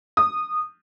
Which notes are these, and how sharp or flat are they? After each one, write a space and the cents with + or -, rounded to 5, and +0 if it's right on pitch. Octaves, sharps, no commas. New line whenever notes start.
D#6 -20